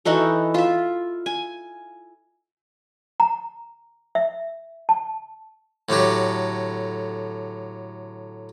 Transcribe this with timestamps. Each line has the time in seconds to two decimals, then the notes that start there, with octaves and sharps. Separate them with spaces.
0.05 E3 D#4 F#4 A4
0.54 F4 E5
1.26 G#5
3.20 A#5
4.15 E5
4.89 A5
5.89 A2 D3 F#3 G4